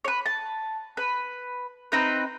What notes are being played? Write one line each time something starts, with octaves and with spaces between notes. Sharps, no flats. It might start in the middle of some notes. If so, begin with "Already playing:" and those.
B4 C#5
A5
B4
C4 D#4 B4